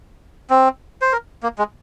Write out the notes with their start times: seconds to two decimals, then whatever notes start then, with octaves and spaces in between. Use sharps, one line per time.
0.50 C4
1.02 C5
1.12 A#4
1.43 A#3
1.58 G#3